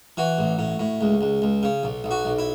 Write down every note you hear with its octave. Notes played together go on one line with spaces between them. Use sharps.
E3 F#4
A1
A2
A2
C#2
C#2
C#2
C#3
B1
B1
F#4
B1
E4